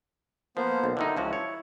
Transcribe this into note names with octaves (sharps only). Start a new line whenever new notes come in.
F3 A#3 B3 C5
B1
D3 D#3 D#4 E4
C#2 F3 F#4
C#5